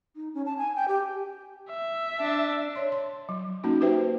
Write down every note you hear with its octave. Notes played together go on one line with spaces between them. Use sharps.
D#4
C#4
A5
G#5
G5
G4
E5
D4
C#5 C6
C6
F#3
A#3 C#4 D#4 F#4
F#4 G4 B4 C5 E5 G5